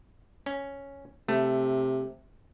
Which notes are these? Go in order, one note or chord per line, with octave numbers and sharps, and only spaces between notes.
C#4
C3 A3